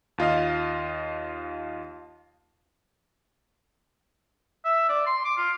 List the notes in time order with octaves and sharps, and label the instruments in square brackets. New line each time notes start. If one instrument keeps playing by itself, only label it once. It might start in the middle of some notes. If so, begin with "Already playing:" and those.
[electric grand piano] D#2 F4 D#5 F5
[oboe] E5
D5
C6
D6
F4